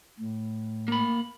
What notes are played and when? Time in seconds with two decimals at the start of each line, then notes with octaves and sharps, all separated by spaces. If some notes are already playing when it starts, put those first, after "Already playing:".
0.20 A2
0.88 A#3 B5